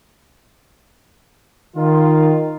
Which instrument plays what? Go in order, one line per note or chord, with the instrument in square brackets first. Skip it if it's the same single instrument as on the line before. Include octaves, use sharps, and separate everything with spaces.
[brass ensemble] D#3 F4